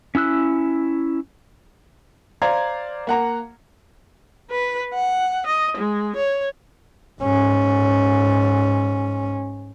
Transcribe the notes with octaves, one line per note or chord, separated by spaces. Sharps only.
C#4 E4 E6 F#6
C5 D5 F5 A#5 G#6
A#3 F#5 A#5
B4
F#5
D#5
G#3
C#5
G#2 C#4